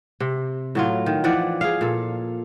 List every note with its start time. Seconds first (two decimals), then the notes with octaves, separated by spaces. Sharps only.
0.20 C3
0.75 A2 F#3 F4
1.06 D#3
1.24 E3 F3 D5 F#5
1.61 G#4 F5
1.81 A#2 A4